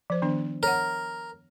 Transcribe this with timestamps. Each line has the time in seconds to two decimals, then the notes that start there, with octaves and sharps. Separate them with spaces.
0.10 F3 C5
0.22 D#3 B3 D4
0.63 A#4 C#5 F#5